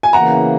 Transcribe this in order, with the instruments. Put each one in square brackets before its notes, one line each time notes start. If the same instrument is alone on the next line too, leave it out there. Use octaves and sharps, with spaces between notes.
[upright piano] G#5
[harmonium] C#3 E3 A#3 [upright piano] F#5 A#5